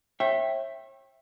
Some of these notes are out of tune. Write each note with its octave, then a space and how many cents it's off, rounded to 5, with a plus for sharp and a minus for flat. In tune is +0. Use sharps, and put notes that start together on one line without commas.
C#5 -40 E5 +0 G5 +0